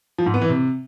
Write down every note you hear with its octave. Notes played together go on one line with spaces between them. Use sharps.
F3
G#2
B3
E3
C3